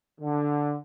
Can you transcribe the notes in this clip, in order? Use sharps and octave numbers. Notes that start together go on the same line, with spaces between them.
D3